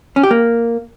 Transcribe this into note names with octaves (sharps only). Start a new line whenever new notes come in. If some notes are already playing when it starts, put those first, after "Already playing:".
C#4
G4
A#3